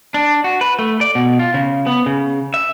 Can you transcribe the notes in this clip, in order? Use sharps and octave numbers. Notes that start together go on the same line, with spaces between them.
D4
F#4
B4
A3
D5
B2
F4
C#3
B3
C#3
E5